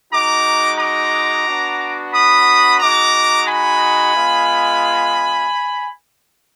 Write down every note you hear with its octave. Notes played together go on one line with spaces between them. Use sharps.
G#3 D#4 F#4 A#5 D6
A#5 D6
B3 D4 F#4
B5 D#6
G#3 D#4 F#4 A#5 D6
G#5 B5
G#3 B3 F4